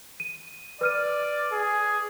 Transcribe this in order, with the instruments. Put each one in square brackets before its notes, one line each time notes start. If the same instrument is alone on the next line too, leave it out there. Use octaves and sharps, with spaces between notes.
[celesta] D#7
[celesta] B4 F6 D#7 [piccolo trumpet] D5
[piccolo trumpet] G#4